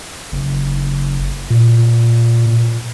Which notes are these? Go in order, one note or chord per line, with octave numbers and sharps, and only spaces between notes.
F#1
A#2